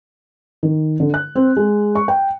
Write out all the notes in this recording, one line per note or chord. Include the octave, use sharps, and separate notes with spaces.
D#3
D3
F#6
C4
G#3
C#6
G5